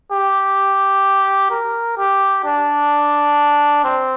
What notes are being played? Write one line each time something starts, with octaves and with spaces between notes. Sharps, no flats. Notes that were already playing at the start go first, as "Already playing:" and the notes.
G4
A#4
G4
D4
C4